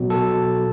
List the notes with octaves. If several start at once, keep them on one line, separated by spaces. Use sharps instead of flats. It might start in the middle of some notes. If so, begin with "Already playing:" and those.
Already playing: B2 F#3
A4